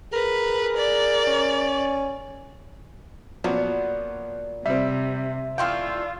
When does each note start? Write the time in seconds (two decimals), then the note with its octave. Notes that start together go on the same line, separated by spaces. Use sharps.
0.13 G#4 A#4 B4
0.77 D5
1.27 C#4
3.44 A#2 F3 F#3 B3
4.66 C3 G3 C4 E5
5.58 E3 A3 D4 F4 F5 G5 C6 F6